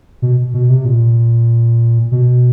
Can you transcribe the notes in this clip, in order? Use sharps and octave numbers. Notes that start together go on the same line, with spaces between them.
B2
B2
C3
A#2
B2